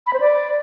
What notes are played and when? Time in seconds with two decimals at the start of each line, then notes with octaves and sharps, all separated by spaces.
0.07 B5
0.13 C5
0.20 D5